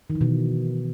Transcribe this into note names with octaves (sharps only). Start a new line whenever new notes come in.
D#3
E3
B2